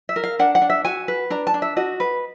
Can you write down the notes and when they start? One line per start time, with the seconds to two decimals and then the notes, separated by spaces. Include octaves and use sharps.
0.09 E5
0.16 A#4
0.24 F5
0.39 D4 F#5
0.55 F#5
0.62 D4
0.70 E5
0.85 F#4 G#5
1.08 B4
1.30 D4 A#5
1.47 A5
1.54 D4
1.62 E5
1.77 F#4 D#5
2.00 B4